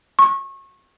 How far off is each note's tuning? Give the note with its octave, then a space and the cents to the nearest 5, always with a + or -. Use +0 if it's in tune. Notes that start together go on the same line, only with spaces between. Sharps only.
C#6 -25